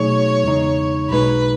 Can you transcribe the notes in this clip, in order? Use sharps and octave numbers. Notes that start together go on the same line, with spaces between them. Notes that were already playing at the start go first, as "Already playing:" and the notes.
Already playing: B2 F#3 A3 D#4 G#4 C#5
E2 C#3 G#3 D#4
B1 B2 G#3 D#4 B4